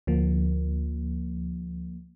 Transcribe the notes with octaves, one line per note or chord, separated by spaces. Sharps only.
D2 F3 A#3